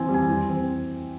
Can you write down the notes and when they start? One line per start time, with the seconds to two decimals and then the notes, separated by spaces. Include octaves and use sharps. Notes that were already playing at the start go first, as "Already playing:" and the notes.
Already playing: E3 C4 G#5
0.09 G3
0.14 G#5
0.29 E3
0.49 C4